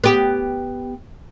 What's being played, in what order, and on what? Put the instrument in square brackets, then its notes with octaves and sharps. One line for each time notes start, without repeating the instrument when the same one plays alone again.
[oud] B3 G4